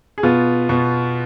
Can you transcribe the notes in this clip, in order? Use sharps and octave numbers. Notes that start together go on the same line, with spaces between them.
G#4
B2 B3 F4
B2 B3